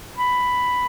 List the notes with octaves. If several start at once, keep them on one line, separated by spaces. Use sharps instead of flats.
B5